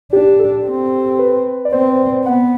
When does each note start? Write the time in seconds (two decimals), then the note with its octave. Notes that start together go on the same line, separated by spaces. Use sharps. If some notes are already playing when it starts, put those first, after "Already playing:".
0.12 D4 G4
0.39 A4
0.65 C4
1.19 B4
1.65 D5
1.72 C4 C5
2.25 B3 F#5